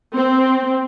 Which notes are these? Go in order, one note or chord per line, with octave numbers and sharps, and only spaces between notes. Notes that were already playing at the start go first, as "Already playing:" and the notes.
C4